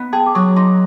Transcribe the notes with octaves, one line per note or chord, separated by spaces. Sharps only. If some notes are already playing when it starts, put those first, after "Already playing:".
Already playing: B3 D#4
G#4 G5 A5
D6
F#3 C#6 D#6
D#4 C6 D6